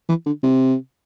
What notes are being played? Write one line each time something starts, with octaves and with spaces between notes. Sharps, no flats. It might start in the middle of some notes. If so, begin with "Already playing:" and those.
E3
D3
C3